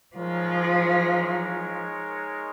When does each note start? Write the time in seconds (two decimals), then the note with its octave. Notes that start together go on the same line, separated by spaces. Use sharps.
0.16 F3 G#3 D#4 A#4 C#5